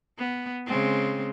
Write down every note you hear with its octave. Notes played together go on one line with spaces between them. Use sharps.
B3
C#3 G#3 C4